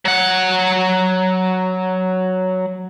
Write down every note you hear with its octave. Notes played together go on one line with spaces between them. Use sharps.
F#3 F#5